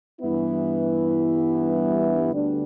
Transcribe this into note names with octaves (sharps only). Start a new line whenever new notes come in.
G2 E3 B3 E4
D2 D3 G3 B3 D4